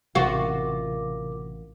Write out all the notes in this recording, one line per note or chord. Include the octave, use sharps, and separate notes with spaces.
A1 C3 F4 F#4 A#4 D6